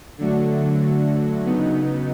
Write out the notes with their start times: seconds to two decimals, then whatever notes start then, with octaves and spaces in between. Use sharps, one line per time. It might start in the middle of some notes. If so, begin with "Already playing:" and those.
0.18 D3 F#3 A3 D4 F#4
1.46 C#3 F#3 B3 D#4